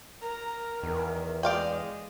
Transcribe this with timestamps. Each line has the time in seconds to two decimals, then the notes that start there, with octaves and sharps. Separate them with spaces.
0.22 A#4 A#5
0.83 E2 D#3
1.43 G#3 D5 F5 G5